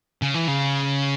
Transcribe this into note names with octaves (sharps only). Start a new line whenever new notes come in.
C#3
E3
C#3